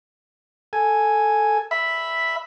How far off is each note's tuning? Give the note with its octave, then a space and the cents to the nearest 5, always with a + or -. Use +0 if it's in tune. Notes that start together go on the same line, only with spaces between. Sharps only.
A4 +0 G#5 +0
E5 +0 B5 +0